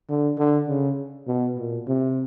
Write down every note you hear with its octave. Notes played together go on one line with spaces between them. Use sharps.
D3
D3
C#3
B2
A#2
C3